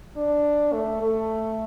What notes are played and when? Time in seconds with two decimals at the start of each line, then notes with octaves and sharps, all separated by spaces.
0.17 D4
0.73 A3
1.02 A3